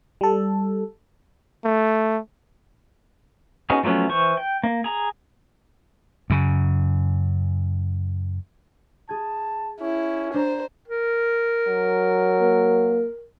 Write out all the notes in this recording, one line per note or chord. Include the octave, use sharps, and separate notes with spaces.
G3 A4
A3
B3 C#4 D#4 F#4 G#4
F3 F#3 A3 B3 C#4
E3 C5 C#6
G5
A#3
G#4 A#5
F#2 C#3
G#4 A5 G#6
C#4 E4
D4 C5 A#5
A#4
F#3
A#3